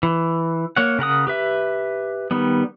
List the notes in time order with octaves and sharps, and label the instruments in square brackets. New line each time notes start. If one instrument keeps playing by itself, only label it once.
[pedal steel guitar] E3
A#3 C#5 F#5
C#3 A#4 F#5 D#6
G4 B4 E5
D#3 G3 B3